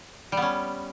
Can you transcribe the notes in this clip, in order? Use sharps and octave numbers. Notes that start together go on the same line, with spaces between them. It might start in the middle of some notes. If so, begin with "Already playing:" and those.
G3 B3 C#4